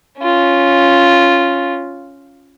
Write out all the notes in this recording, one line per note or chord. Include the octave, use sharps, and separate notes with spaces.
C#4 F4